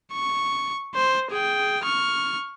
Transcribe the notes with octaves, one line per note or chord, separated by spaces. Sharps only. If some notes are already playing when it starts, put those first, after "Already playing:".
C#6
C5
G#4 G5
C#6 F6